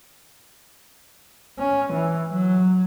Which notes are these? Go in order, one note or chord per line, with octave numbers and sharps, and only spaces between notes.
C#4
E3
F#3